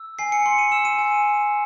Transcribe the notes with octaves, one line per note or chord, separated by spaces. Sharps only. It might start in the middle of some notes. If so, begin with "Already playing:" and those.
Already playing: E6
G#5 C7
C#7
C6 C#7
D#7
E6 E7
D#7
G#5